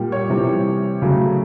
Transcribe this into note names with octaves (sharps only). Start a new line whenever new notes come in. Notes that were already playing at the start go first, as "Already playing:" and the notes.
Already playing: A#2 G3
C#5
C3 E3 G3
C#3 F#3 A3